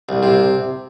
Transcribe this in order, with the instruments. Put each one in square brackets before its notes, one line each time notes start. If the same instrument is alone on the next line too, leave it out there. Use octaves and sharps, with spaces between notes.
[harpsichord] C2
C3